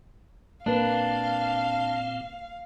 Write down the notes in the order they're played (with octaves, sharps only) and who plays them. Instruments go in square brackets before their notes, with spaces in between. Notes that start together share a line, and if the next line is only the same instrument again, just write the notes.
[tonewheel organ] A#2 C4 [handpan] A#3 B4 [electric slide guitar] D4 [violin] F5